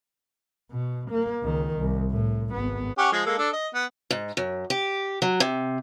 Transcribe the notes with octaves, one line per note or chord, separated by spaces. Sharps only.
B2
A#3
C#2 D#3
C2
A2
G#1 B3
C#4 G4 F#5
F3 G#3 G#4
G#3 A#3 A4
D4 A4
D#5
B3
G#2
F#2
G4
F#3
C3